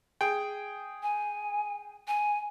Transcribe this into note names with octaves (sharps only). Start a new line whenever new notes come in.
G#4 G5
G#5
G#5